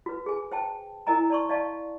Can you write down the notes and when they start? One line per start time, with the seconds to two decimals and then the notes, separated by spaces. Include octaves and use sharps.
0.06 F#4 B4
0.26 G#4 G#5
0.52 C5 G5 A5
1.07 E4 A#4 C5 D#5 G#5 A#5
1.30 D5 A5 C6 C#6
1.49 D5 D#5 F5 A5 C#6